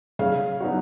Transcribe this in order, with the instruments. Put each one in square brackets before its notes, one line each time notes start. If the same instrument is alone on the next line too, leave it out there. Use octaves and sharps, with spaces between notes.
[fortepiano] C#3 [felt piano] F5
[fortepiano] F#3 B3 D#4 F#4